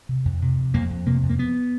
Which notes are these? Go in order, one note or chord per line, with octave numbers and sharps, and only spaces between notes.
C3
F2
C3
F2
F2 A#3
F2
C3 A#3
F2
A#3
F2 B3